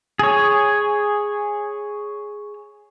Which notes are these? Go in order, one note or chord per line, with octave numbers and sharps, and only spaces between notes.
G#4 C#5